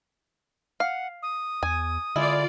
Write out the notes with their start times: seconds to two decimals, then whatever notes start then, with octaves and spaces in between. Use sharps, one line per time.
0.80 F5 F#5
1.23 D#6
1.63 E2 G#5
2.16 D3 G#3 E4 F4 D5